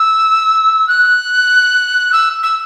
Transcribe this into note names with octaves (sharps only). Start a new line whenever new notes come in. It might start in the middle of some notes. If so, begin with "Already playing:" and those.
Already playing: E6
F#6
E6
E6